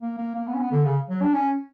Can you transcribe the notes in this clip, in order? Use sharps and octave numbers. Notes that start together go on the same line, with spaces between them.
A#3
A#3
A#3
B3
C#4
B3
D3
C#3
F#3
D4
C#4